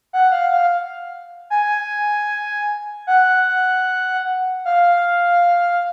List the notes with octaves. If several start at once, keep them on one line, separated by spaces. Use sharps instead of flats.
F#5
F5
F5
G#5
F#5
F5